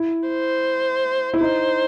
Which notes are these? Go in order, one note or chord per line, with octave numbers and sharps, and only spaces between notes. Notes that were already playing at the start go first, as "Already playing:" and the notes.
Already playing: E4
C5
E4
D#4 C5